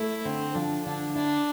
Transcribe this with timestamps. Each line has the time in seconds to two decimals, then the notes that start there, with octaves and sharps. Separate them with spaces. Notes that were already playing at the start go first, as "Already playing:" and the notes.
Already playing: A3 E4
0.25 D3 C4
0.54 F3 D4
0.85 D3 D4
1.15 D4 E4